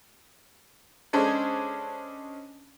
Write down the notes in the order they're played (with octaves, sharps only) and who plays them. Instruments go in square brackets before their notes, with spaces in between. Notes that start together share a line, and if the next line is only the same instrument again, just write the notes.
[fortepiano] G#3 C#4 D4 G#4 A4 C5